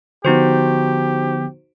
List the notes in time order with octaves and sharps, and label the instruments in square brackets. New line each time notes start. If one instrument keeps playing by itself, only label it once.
[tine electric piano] D3 F3 B3 [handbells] D#4 F#4 C5 [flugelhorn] G4